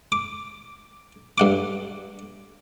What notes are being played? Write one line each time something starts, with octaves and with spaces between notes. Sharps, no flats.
D6
G2 F#5 D6